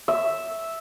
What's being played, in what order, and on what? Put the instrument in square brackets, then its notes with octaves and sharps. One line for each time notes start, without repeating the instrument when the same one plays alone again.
[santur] E5